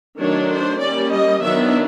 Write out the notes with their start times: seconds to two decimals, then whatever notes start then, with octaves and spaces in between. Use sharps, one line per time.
0.19 D#3 F#3 A3 D4 C#5
0.51 C5
0.80 G3 A#3 C#4 D5
1.11 D#5
1.42 D#3 F#3 B3 D4 E5